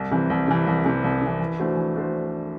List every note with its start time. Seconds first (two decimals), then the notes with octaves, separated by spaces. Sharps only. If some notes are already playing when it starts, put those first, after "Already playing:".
Already playing: C2
0.11 C3 E3
0.30 C2
0.47 C3 E3
0.67 C2
0.84 C3 E3
1.04 C2
1.22 C3 E3
1.40 E3
1.59 A3 D4 F#4 C5
1.77 E3
1.95 A3 D4 F#4 C5